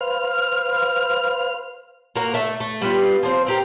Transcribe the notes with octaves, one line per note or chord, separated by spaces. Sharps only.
B4 C5 F5 F6
A#3 F#4 A#4
A3 E5
A3
G3 B3 F4
F3 C4
C4 G4 A#4